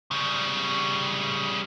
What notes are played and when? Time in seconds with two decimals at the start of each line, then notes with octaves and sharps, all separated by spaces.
0.11 C#3 G3